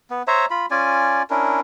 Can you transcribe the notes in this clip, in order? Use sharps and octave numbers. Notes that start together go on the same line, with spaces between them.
B3
C5 C#5 E5 A#5
F4 B5
C#4 F4 D5 G#5
C#4 D4 E4 A#4